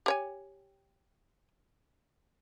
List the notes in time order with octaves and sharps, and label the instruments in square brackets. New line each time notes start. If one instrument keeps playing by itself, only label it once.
[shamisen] G4 C#5 G#5